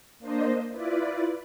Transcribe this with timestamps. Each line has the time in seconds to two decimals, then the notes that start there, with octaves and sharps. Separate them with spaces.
0.19 A#3 D4 C5 D#5
0.71 E4 F4 B4 D5